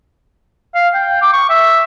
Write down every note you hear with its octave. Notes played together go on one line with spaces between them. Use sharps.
F5
G5
D6
C#6
E5